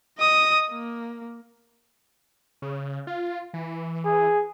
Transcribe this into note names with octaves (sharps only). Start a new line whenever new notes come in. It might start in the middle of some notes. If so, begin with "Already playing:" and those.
D#5 D#6
A#3
C#3
F4
E3
G#4